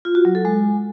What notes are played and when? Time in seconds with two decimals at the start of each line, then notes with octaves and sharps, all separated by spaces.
0.05 F4
0.15 F#4
0.25 F#3
0.35 A4
0.45 G#3